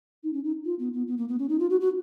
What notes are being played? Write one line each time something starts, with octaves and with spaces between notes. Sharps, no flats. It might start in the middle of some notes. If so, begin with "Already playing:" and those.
D#4
C#4
D#4
F4
B3
B3
B3
A#3
B3
C#4
D#4
F4
F#4
F#4